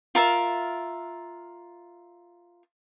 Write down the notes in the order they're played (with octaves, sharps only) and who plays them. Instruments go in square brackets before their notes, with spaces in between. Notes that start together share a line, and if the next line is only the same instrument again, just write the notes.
[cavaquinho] F4 A#4 E5